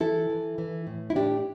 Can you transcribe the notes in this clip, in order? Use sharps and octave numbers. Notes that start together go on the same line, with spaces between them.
E3 E4 A4
E3
E3
A2
E4
A2 D4 G4